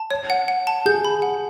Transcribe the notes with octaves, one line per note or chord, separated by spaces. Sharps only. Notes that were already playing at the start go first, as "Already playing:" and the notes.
Already playing: A5
C#5
F#5
F#5
A5
G#4 G6
B5
F#5